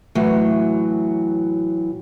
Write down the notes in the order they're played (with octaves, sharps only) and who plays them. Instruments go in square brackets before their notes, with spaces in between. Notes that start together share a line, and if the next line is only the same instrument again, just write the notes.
[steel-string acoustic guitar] A2 E3 F#3